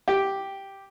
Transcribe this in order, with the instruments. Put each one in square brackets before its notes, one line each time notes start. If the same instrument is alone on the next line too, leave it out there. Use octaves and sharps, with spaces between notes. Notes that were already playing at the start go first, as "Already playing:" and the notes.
[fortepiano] G4